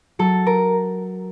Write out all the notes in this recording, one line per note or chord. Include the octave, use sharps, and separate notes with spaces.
F#3 A4
A#4